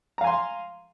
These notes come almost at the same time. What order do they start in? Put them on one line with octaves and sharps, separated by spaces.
A#5 F5 G#5 C6